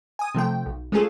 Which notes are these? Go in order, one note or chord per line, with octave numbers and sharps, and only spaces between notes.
G#5 D#6
C3 F3 A3 G5
B1
G#3 A3 C#4 F4 G#4 A4